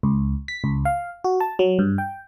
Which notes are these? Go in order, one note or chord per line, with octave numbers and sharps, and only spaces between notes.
C#2
B6
C#2
F5
F#4
A5
F#3
G2
G5